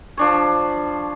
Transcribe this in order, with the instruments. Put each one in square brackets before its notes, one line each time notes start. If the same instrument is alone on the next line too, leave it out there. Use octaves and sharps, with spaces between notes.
[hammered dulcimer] F3 D4 C#5